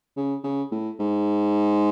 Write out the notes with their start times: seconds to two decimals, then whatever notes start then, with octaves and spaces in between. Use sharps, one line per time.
0.16 C#3
0.44 C#3
0.71 A2
0.99 G#2